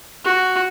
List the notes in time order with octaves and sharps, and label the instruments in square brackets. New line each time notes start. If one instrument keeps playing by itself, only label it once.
[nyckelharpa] F#4